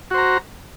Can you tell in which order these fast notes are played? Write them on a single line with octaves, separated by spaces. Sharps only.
F#4 C5 A#5